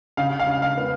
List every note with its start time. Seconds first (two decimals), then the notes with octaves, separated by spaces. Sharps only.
0.17 C#3 F5
0.40 F5
0.47 C#3
0.62 F5
0.77 B3